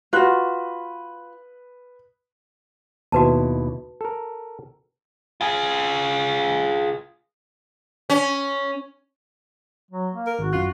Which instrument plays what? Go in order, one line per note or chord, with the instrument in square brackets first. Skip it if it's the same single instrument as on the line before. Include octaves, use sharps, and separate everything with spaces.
[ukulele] F4 F#4 [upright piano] B4 F#6
[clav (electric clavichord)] D#2 B2 E4 [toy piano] F#4 B4 A5
[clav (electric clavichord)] A4 A#4
[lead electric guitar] F4 G#4
[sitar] C#4
[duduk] F#3
A#3
[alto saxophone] A#4
[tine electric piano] G#1 [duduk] F#4
[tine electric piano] F#2 F#6 [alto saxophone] F4